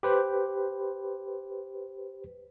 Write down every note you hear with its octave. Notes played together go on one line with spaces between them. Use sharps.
G4 B4 C5